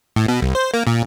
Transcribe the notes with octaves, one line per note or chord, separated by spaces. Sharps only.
A2
B2
C2
C5
A#3
A#2